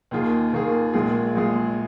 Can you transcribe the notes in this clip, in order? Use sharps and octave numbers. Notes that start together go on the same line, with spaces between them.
D#2 D#3 A#3 F4 G#4
D#2 D#3 A#3 F4 G#4
A#1 A#2 G#3 F4 G#4
A#1 A#2 G#3 F4 G#4